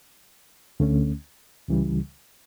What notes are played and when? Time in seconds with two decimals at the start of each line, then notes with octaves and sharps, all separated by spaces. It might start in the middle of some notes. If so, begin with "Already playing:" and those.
0.80 D2 D3 A3 C#4
1.68 C#2 C#3 E3 G3